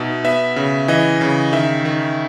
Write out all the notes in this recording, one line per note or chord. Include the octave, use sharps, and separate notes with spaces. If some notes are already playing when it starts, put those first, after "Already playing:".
Already playing: B2 D#4 E5
B3 E5
C#3
E3 D#5
C#3
D#3 E5
D#3